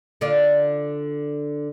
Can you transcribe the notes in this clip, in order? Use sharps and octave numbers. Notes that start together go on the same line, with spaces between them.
D3 F4 D5